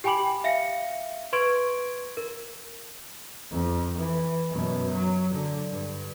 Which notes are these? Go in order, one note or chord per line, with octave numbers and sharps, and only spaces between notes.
G4 G5 G#5 B5 D6 F#7
E5 F5 A#6 C#7
B4 C6 C#6 G#6 D7
A#4
F2
E3
F#2 B2
F#3
D3
G2